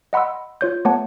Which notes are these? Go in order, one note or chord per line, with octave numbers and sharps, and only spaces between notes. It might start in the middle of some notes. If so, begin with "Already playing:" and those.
D#5 F#5 B5 C6 E6
F4 C#5 G6
A3 B3 C#5 F#5 A5